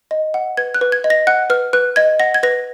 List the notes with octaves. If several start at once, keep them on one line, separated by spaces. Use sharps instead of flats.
D#5
F#5
B4 G#6
F#6
B4
G#6
D#5
A#6
F#5 F#6
B4 F6
B4 F#6
D#5 G#6
F#5 A#6
G#6
B4 A#6